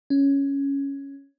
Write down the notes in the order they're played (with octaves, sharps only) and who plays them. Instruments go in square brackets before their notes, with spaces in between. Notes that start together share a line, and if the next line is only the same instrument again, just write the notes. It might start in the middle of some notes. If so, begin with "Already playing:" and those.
[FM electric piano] C#4